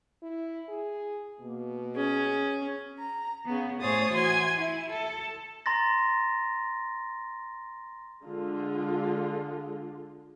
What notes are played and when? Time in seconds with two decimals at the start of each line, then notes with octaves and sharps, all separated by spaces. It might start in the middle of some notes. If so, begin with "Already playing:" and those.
0.22 E4
0.69 G#4
1.40 B2 A#3
1.95 C#4 G#4
2.99 A#5
3.46 C#3 B3
3.79 A2 G#4 C5 C#5 D#6 A6
4.12 E3 F#4 G#5 C6 G#6
4.59 E4
4.91 A4
5.66 A#5 C6 A6 A#6
8.25 D3 G#3 F4